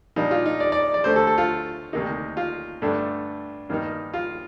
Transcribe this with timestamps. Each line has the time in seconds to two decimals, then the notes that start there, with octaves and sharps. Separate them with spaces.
0.16 A#2 G3 D4 D#4
0.31 F4
0.46 D#4
0.60 D5
0.72 D5
0.94 D5
1.04 D2 D3 A3 C5
1.16 A4
1.27 A4
1.38 F4
1.93 D2 C3 D#3 A#3 D#4
2.37 F4
2.82 G2 D3 A3 D4
3.69 G2 D#3 A#3 D#4
4.14 F4